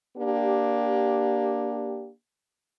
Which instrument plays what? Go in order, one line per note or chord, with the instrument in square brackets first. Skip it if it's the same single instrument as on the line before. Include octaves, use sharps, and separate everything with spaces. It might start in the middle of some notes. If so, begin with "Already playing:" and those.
[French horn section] A#3 D4 G4